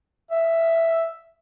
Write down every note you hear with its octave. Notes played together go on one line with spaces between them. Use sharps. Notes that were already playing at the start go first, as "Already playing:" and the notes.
E5